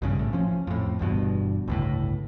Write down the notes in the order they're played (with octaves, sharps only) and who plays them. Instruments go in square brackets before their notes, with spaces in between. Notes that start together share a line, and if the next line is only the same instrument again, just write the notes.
[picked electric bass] B1 G2 C#3
G#1 A2
F3 C#4
F2 A2
G1 E2 G2 B2
G1 C#2 A2